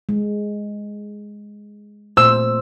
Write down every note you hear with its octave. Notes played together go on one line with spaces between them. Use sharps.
G#3
A#2 A3 C5 E6